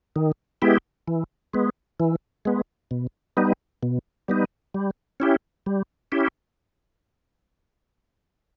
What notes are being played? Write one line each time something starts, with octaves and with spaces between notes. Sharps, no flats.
D#3
G#3 B3 E4 G4
E3
G#3 B3
E3
G#3 B3
B2
G3 B3 D#4
B2
G3 B3 D#4
G3
C#4 E4 G4
G3
C#4 E4 G4